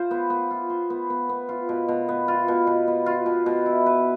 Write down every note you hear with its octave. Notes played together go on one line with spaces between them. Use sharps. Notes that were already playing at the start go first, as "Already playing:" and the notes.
Already playing: F4 C5
B3
B3
F4
C5
B3
B3
B3
F4
B2
B2
B3
F4
B2
B2
B3
F4
B2
B2
E4
B4